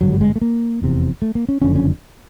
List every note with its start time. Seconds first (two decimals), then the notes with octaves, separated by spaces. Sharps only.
0.01 G#1 G2 D3 F#3
0.12 G3
0.21 G#3
0.36 A3
0.42 A#3
0.82 F1 E2 C3
1.22 A3
1.35 A#3
1.49 C#4
1.62 F#1 F2 D3 C#4
1.76 C#4